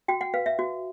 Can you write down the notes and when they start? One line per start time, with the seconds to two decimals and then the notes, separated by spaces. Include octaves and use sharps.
0.08 F#4 G5
0.21 F#5
0.34 B4 F5
0.46 E5
0.59 F#4